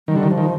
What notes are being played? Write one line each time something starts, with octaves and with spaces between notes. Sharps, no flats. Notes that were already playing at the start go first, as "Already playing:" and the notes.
D#3 G3
D3
D#3
F3
D#3